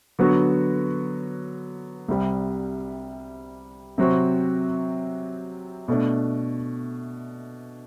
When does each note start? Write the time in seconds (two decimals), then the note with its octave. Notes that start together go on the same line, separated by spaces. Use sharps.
0.19 D3 F#3 B3 F#4
2.08 C2 C3 G3
3.98 C3 F#3 C4 F#4
5.88 B2 A3 D4